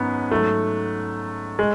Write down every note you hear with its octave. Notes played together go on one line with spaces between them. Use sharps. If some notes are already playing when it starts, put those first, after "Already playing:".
Already playing: G#2 D#3 F#3 B3 C#4
G#2 F#3 A3
G#3